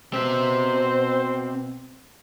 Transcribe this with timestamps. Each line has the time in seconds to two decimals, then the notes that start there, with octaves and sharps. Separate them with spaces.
0.14 B2 C4 C5 E5